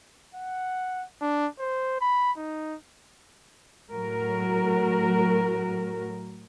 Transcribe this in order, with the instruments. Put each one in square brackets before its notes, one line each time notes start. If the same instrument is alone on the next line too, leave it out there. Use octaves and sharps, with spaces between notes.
[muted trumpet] F#5
D4
C5
B5
D#4
[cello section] A2 F#3 F#4 A#4